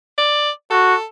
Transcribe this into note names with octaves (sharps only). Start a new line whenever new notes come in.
D5
F#4 A4